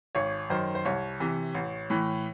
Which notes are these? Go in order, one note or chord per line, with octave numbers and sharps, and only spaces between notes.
G#1 C#5
F#2 D#3 C5
C5
C2 C#5
C3 E3
A1
A2 E3